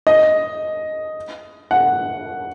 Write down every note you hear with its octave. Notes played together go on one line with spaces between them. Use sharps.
D#5
F#5